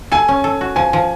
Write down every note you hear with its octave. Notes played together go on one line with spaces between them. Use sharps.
A4 G#5
C#4
A4
F#4
F3 G#5
F3